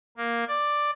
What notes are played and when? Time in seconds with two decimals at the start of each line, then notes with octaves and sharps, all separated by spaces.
0.17 A#3
0.48 D5